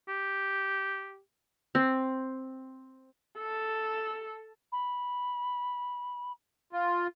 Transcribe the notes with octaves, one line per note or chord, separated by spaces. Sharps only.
G4
C4
A4
B5
F4